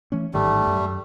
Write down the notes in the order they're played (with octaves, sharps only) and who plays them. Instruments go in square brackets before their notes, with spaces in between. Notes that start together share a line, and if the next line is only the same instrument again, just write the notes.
[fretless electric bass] E3 A3 C#4
[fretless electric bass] A1 G#2 D#3 [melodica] G3 A3
[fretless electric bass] F#2